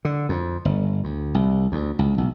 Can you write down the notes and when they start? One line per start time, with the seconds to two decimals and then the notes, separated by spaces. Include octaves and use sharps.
0.05 D3
0.29 F2
0.65 G1
1.04 D2
1.34 C2
1.72 D2
1.99 C#2
2.18 B1